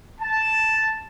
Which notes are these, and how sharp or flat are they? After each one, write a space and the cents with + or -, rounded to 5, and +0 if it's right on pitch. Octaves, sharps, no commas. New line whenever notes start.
A5 +0